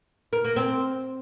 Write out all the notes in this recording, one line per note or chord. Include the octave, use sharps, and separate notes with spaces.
A#4
A#3
C4